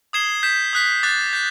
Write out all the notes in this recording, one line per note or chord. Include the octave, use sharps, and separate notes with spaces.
D#6 G#6 C7 E7 G7
G6 B6 E7
D#6 F#6 B6
D6 F#6 A6
G6 B6